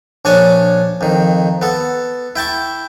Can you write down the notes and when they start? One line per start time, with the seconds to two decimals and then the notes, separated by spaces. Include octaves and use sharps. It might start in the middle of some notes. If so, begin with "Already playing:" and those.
0.25 A#1 D4 C#5 G#5 A5
1.01 F2 D#3
1.62 B3 A4
2.36 E4 G5 A5 C#6